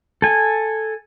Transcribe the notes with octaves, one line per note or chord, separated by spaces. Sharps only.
A4 G#5